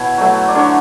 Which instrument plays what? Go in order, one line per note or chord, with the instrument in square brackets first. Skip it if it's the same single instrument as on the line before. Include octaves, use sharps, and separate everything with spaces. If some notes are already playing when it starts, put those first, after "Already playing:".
Already playing: [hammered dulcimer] B2 E4 C#5
F#3 A3
D5
D3 C#5